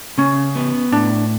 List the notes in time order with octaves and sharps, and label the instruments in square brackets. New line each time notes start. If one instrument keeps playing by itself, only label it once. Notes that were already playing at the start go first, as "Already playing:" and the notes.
[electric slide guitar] C#3 [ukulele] C#4
[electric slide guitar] B3
[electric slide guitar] A2 [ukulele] D4